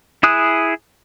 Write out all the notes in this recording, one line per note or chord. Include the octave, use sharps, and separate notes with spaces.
E4 G#4 D#6 F#6